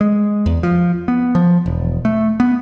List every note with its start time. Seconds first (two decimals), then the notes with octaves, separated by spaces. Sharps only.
0.01 G#3
0.46 E2
0.63 F3
1.08 B3
1.35 F3
1.66 E1
2.05 A3
2.40 B3